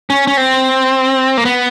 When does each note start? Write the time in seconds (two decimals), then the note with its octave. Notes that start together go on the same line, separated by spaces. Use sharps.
0.10 C#4
0.27 C#4
0.37 C4
1.37 A#3
1.45 B3